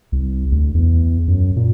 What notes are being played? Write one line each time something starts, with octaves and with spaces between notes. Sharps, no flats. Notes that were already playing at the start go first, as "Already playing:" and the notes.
C2
D2
E2
F#2
A#2